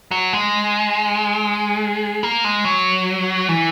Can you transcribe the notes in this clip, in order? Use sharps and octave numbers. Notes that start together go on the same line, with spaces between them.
F#3
G#3
A#3
G#3
F#3
E3